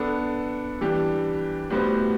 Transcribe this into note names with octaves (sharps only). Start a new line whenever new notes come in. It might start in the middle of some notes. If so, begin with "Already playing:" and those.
Already playing: B3 D4 A4
E3 G3 D4 G4
A2 G3 B3 F#4 C5